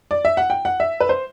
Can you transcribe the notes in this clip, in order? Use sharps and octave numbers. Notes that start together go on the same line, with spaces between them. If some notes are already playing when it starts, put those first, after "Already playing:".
D5
E5
F#5
G5
F#5
E5
B4
C5